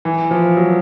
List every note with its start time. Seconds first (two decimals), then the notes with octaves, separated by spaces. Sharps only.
0.05 E3
0.31 F3
0.57 F#3